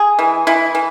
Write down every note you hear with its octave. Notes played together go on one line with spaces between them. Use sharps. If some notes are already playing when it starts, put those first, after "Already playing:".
Already playing: G#4
E3
E3 E4
E3